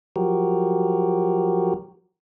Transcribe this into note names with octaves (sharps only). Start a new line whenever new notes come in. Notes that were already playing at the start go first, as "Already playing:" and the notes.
F3 F#3 F#4 G4 A#4